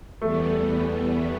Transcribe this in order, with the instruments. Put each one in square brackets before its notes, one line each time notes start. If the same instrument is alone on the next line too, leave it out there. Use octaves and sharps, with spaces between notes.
[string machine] E2 E3 G3 B3 [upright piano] A3